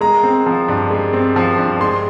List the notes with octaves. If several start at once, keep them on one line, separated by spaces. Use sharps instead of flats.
G#3 A#5
C4
F3
G2
G#3
C4
F3
G2
G#3 C6